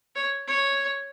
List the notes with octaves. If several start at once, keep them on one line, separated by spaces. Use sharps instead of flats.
C#5
C#5